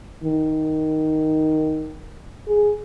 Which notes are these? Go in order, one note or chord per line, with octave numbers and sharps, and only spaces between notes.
D#3
G#4